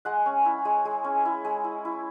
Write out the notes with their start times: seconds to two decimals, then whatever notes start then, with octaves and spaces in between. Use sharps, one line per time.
0.05 G#3 F#5
0.26 C#4
0.45 E4
0.65 G#3
0.85 G#3
1.04 C#4
1.25 E4
1.45 G#3
1.64 E4
1.85 E4